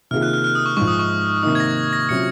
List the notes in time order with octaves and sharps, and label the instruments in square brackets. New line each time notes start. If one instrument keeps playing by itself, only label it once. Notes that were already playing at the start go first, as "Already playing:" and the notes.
[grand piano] C3 D#3 A#3 F4 G#4 [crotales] F6
[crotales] F#6
F6
F6
D#6
C#6
[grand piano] G#2 F3 G#3 [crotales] C#6
[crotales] D#6
C#6
[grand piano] C3 D#3 A#3 D#4 [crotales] D#6
[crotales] G#6
A#6
A#6
[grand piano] C3 F#3 C#4 F4 [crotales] C#7